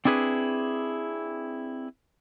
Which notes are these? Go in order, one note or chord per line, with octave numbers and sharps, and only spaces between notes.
C4 D4 E4 G#4 B4